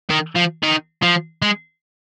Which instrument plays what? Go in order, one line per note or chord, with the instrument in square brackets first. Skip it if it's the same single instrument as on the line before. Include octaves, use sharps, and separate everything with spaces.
[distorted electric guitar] D#3
F3
D#3
F3
G#3